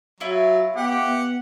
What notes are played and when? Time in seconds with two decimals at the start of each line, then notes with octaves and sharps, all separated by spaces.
0.20 F#3 E4 F4 C#5
0.76 B3 G4 F#5
1.06 B3